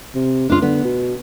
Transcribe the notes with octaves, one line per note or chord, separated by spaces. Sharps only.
C3
C#2 D4 F4
D3 B3
B2